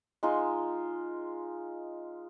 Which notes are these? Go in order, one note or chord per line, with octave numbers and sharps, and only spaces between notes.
G#3 D#4 F4